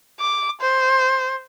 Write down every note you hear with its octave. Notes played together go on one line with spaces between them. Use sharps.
D6
C5